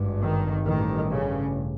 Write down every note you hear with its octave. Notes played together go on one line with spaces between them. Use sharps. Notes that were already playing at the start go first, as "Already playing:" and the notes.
Already playing: G#1 G2
D#3
A1 G2 D#3
C#3